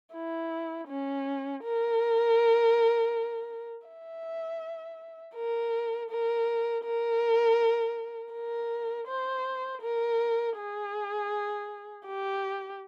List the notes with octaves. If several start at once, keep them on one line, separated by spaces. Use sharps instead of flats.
E4
C#4
A#4
E5
A#4
A#4
A#4
A#4
C5
A#4
G#4
G4